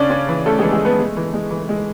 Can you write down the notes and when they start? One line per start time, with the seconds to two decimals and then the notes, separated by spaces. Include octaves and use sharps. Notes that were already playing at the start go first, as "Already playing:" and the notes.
Already playing: C#3 C#4 D4 D5
0.10 C#4
0.29 E3
0.46 A3 C#4 A4
0.59 E3 G#3 G#4
0.73 G#3 G#4
0.81 A3 B3 B4
0.99 G#3
1.17 E3
1.34 G#3
1.51 E3
1.69 G#3